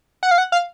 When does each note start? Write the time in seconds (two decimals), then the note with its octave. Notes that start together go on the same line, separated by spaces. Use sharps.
0.23 F#5
0.31 F5
0.38 F#5
0.52 F5